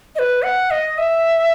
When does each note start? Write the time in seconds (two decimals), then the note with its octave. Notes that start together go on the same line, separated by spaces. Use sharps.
0.15 D#5
0.19 B4
0.43 F#5
0.71 D#5
0.98 E5